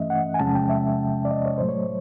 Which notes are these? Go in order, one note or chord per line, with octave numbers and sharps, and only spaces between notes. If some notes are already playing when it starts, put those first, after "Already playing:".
Already playing: G2 E3 A3 C#4 D#5 E5
F#5
G#5
E2 C3 F3 G#3 C#4 A5
G5
E5
D5
D#5
C#5
A2 F#3 A3 C5
C#5